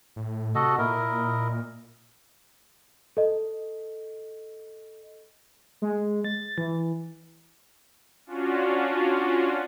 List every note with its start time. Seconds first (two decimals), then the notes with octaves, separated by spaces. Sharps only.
0.16 A2
0.55 C3 F#4 A4 D#5
0.78 A#2 E4 A#4 D#5
3.17 A4 D#5
5.82 G#3
6.25 A6
6.58 E3
8.26 C#4 D4 F4 F#4